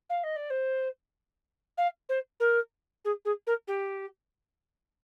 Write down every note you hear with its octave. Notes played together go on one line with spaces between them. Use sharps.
F5
D#5
D5
C5
F5
C5
A#4
G#4
G#4
A#4
G4